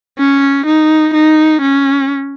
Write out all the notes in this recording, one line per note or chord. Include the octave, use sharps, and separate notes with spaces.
C#4
D#4
D#4
C#4